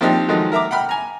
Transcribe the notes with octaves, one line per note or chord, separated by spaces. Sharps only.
F3 A#3 C4 D4 D#4 G4
D#3 F3 F#3 G#3 A3 D#4
A#4 E5 A#5 D6
F#5 G5 B5 F6
G#5 A#5